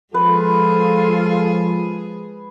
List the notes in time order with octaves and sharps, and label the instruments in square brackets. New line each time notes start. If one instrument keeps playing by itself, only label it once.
[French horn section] F3 [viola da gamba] G#3 G#4 [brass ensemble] F4 A4 [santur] B4